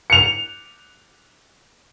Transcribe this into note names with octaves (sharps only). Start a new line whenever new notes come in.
C#7 F7